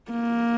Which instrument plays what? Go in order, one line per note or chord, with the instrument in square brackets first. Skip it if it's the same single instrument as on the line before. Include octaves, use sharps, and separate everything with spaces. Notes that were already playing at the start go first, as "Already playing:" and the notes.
[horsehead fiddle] A#3